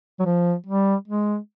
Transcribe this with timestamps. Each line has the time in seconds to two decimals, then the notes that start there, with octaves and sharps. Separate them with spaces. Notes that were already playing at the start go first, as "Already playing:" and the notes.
0.19 F#3
0.25 F3
0.66 G3
1.08 G#3